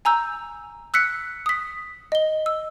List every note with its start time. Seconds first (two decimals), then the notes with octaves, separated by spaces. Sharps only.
0.05 G#5 A#5 E6 G6
0.94 E6 F#6 B6 C#7
1.46 D#6 B6
2.12 D#5 G7
2.46 E6